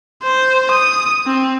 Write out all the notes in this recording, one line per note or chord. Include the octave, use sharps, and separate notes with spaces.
C5
D#6
C4